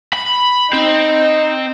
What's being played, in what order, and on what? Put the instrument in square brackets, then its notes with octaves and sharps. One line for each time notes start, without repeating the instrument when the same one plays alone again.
[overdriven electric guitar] B5
[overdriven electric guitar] C4 [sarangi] D#4